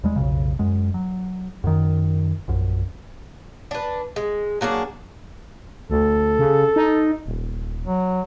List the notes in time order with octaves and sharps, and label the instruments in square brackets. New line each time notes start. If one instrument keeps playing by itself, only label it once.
[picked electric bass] E2 G3 G#3
B1 F2 C#3
F#2 G#3
F#3
F#2 D#3
A#1 F#2
[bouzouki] D4 B4
G#3
F#3 A#3 D4 G#4
[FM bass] D2 [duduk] A4
[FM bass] C#3
D#4
D#1
[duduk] F#3